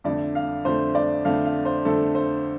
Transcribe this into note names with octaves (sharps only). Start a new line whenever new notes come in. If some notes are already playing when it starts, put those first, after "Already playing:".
F2 D3 A3 D5
F5
F2 D3 A3 C5
D5
F2 D3 A3 F5
F5
C5
F2 D3 A3 A4
C5